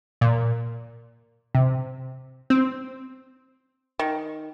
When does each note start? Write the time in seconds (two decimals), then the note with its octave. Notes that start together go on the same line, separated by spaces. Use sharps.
0.21 A#2
1.55 C3
2.50 C4
3.99 D#3